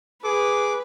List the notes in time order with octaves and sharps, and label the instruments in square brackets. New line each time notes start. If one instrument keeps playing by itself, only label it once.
[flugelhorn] G#4 [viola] B4 [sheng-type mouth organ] D6